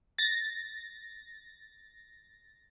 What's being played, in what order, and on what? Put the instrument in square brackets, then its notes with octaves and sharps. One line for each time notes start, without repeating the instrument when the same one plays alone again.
[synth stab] A6 A#6